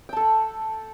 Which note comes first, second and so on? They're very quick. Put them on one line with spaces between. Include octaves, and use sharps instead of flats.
G5 A5 A4 F#5